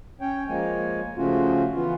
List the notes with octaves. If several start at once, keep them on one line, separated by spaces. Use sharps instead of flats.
C#4 C#5 G5
F3 G#3 A#3 C#5 G#5
C#3 F3 A3 C#4 F4 F#4
E3 B3 F4